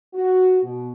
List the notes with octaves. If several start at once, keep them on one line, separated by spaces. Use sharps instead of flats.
F#4
B2